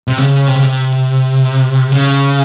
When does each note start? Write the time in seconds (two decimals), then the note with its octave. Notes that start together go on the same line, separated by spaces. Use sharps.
0.08 C3
0.18 C#3
0.48 C3
0.55 C#3
0.62 C3
1.92 C#3